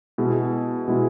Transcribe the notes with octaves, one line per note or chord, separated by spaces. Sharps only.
B2 G#3 E4 G#4
B2 G#3 E4 G#4